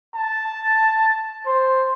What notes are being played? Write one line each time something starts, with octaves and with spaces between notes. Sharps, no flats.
A5
C5